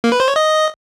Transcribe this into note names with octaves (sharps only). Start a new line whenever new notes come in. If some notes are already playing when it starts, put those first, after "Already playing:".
A#3
B4
C5
C#5
D#5